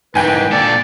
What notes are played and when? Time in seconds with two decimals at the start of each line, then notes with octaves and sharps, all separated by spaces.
0.15 G#2 D#3 E3 B4 G5 G#5
0.52 A#2 D4 A4 D5